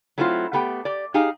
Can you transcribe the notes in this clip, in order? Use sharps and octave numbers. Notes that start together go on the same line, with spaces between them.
F#3 A3 C4 E4 F4
A3 B3 G4 G5
G4 D5
D#4 G4 G#4 F5